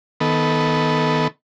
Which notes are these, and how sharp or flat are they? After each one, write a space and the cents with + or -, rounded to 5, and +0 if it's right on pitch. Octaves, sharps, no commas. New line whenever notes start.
D#3 +15 B3 +0 A4 -10